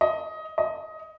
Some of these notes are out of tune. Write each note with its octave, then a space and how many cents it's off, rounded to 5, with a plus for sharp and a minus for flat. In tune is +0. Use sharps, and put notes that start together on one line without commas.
D#5 +15
D#5 +15